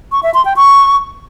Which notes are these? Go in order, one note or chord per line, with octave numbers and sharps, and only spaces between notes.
C#6
E5
C6
G5
C#6